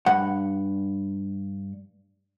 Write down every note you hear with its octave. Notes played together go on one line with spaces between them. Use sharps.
G2 F#5